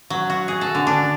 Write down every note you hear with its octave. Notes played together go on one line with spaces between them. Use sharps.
F#3
F#4
G#4
A4
D3
D4